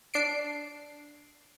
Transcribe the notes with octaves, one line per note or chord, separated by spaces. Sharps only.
D4 C7 D7